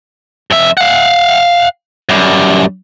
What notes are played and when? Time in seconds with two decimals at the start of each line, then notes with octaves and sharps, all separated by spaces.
0.50 F2 E5
0.77 F5 F#5
2.09 F#2 G3